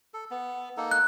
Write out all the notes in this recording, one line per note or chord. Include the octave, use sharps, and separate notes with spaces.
A4
B3
A#3 D#4 A4
F#6